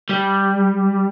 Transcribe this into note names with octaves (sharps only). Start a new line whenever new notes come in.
G3